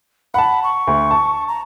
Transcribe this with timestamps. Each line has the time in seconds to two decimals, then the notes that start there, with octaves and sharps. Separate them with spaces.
0.34 F#5 A5 B5
0.64 C#6
0.87 D2
1.11 A5
1.48 A#5